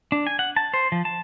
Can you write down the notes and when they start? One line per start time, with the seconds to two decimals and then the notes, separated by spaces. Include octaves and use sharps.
0.12 D4
0.27 G#5
0.39 F#5
0.56 A5
0.74 C5
0.92 F3
1.05 A5